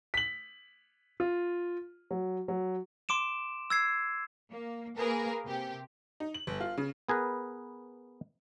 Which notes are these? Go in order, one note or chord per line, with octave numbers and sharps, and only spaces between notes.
B6 F#7
F4
F#3
F#3
C6 D6 D7 E7
E6 G#6 C7
A#3
A#3 G#4 A#4 B4
C3 G4
D#4
F#7
G1
F4
C#3
B3 G#4 A#4 B4